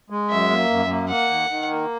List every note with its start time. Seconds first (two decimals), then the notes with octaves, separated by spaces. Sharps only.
0.10 G#3
0.30 F#2 E5
0.50 A#3
0.70 F#2
0.90 A#3
1.09 A#3 F#5
1.29 D#3
1.49 D#3
1.69 A#3